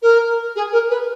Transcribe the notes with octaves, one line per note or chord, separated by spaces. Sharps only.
A#4
G#4
A#4
B4